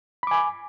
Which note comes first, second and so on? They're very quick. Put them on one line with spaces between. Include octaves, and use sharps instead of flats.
B5 D6 G#5